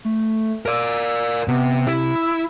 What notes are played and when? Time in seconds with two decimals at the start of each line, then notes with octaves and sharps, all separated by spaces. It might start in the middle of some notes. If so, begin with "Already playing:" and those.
0.05 A3
0.66 A#4 D5 E6
1.48 C3 B3
1.87 C3 E4
2.16 E6